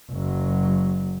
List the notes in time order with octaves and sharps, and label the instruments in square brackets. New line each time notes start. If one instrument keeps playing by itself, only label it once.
[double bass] F#1 F#3